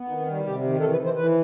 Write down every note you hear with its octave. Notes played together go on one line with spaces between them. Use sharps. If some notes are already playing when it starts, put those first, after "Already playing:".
Already playing: B3
D#3 D#4
C4
G3
D#4
C3 G4
D#3
E3 A4
B4
E3
C5
E3 B4